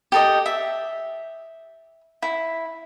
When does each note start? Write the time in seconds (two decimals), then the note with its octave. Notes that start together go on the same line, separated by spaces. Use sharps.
0.12 G4 A4 D#5
0.46 E5
2.22 E4